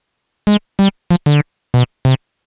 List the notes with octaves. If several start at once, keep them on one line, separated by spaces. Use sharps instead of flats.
G#3
G3
F3
D3
B2
C3